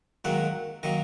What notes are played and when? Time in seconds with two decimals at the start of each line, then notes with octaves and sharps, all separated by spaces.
0.25 G#2 D#3 F#3 A#3 F#5
0.83 D#3 F#3 A#3 D#5